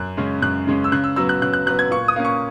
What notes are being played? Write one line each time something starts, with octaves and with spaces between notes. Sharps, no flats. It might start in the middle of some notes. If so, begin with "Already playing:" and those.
Already playing: F#2 F#6
C#3 G#3 C#4
F#2 F#6
C#3 G#3 C#4
E6
C#3 F#6
E6
F#3 B3 E6
F#6
C#3 F#6
F#6
F#3 B3 F#6
G#6
A#2 C#6
D#6
A#3 C#4
C#6